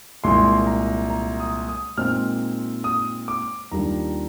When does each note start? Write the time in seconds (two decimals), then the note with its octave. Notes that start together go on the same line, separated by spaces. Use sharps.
0.24 C2 A#2 G#3 C6
0.67 A#5
1.10 A#5
1.40 D#6
1.69 D#6
1.98 A#2 G#3 C4 D#4 F6
2.84 D#6
3.28 D6
3.71 D#2 D#3 G3 D4 F4 A#5